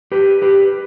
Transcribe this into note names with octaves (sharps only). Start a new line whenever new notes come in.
G4 B4
G4 B4